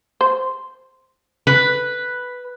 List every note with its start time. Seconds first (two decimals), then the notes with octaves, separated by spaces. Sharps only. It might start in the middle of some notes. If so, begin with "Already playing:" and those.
0.21 C5
1.47 B4